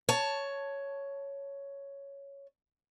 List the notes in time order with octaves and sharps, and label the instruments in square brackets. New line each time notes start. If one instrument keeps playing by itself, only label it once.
[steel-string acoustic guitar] C#5 A5